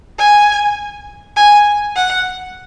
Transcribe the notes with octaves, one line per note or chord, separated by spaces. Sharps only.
G#5
G#5
F#5